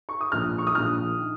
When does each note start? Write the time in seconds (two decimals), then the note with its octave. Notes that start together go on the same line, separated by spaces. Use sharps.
0.09 C#6
0.21 D#6
0.32 A#1 A#2 F3 F6
0.58 C#6
0.67 D#6
0.75 A#1 A#2 F3 F6
1.19 D#3